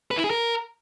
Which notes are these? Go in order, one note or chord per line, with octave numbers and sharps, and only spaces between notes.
B4
E4
G#4
A#4